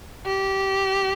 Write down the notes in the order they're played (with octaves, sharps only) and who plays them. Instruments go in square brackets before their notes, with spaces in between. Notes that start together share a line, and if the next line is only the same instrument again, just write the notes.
[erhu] G4